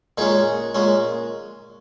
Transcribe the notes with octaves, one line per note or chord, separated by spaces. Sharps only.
A#2 G#3 C#4 D#4 G#4
A#2 G#3 C#4